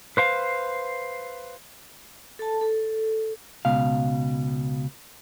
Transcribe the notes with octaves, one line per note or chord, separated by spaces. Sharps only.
B4 C5 F5
A4 A5
A4
C#2 B2 F5